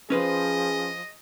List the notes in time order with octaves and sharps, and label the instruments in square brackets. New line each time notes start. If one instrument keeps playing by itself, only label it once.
[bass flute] F3 [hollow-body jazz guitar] C#4 B4 C5 [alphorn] G#4 [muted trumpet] D#5